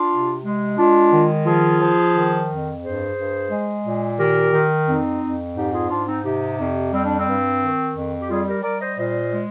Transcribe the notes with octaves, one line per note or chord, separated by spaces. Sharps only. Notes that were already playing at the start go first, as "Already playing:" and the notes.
Already playing: D4 F4
C3
G#3
G#3 D4 F4
D#3
F3 F4 G#4
F3
D#3
F2
G2 G#4 C5
G2
G#3
A#2
D#3 G4 A#4
D#3
F2 C4 D#4
F2
G#2 D#4 G4
F4 G#4
G#2 D4 F4
C4 D#4
C3 D#4 G4
F2
G3 C4
D4
C4
G2
D#3
F2
G4
G3 F4 G#4
G4 A#4
G3 A#4 D5
C5 D#5
A#2 C5 D#5
G#3